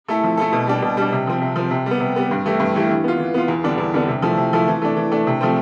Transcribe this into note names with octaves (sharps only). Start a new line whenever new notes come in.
A3 E4 A4
F3
A3 E4 A4
B2
G3 D4
B2
G3 D4
C3
F3 C4
C3
F3 C4
C3
G3 B3
C3
G3 B3
G2
E3 A3 E4 G4
G2
E3 A3 E4 G4
E3
B3 F4
E3
B3 F4
E2
D3 G3 B3 D4
E2
D3 G3 B3 D4
C3
F3 A3 E4
C3
F3 A3 E4
E3
A3 D4
E3
A3 D4
C3
F3 A3 C4